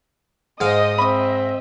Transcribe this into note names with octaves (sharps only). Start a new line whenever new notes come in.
G#2 C5 D#5 F5 D#6
C4 D#5 E5 B5 C#6 D#6